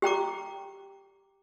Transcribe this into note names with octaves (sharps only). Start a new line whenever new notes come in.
G4 G5 A#5 D6